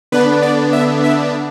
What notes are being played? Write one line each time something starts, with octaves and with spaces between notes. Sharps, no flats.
D3 B3 D4 B4
D5
E5
E5